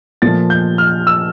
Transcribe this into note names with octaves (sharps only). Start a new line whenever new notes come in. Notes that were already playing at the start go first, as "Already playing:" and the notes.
A#2 F3 A3 A6
G6
F6
E6